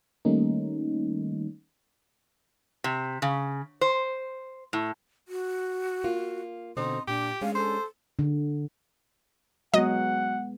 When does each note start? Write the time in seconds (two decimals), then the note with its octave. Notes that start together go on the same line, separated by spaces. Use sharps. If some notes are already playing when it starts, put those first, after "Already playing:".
0.25 D#3 G3 A3 A#3 C#4 D#4
2.84 C3
3.22 C#3
3.81 C5
4.73 A2
5.28 F#4
6.04 A#3 F4
6.77 B2 D3 C4 D#4 C6
7.08 A#2 D4 G4
7.41 G#3 C#4 D4 F5
7.55 A4 C5
8.19 D3
9.74 F#3 G#3 B3 D#5 F#5